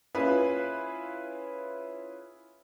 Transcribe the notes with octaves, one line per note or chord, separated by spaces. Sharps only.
C#4 E4 F4 G#4 B4